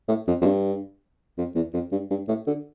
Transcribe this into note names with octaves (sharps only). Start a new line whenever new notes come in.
A2
F2
F2
G2
F2
E2
F2
G2
G2
A2
D3